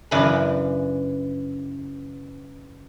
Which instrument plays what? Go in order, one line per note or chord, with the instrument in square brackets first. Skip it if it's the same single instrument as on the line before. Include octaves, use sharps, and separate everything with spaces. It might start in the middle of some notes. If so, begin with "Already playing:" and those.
[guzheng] F#2 C#3 E3 D4 B5